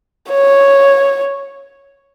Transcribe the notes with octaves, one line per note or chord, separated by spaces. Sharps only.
C#5